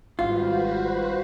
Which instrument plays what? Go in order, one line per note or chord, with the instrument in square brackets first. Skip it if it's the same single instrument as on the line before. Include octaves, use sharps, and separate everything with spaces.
[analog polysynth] G#1 G3 F5 [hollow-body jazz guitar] F4 [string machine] F#4 B4 C5